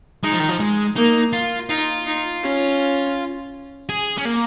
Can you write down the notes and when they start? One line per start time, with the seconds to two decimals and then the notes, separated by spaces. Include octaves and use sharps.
0.23 G#3 D#4
0.32 F3
0.40 D#3
0.49 F3
0.60 G#3
0.96 A#3 D#4
1.33 F4
1.69 D#4 F4
2.06 D#4
2.43 C#4
3.89 G#4
4.18 C#4
4.26 A#3